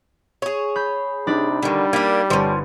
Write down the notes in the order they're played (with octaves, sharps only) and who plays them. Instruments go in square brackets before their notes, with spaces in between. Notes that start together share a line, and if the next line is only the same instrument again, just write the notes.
[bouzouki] G#4 C#5
[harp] B5 G6
[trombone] C3 [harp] D4 D#4 B5
[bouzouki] D3 D#3 [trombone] G3
[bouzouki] A#3 D4 [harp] B6 D#7
[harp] G1 [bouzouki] F3 C#4